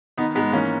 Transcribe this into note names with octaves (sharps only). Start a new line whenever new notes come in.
D#3 B3 D#4
G#2 G#3 B3
E3 A#3 C#4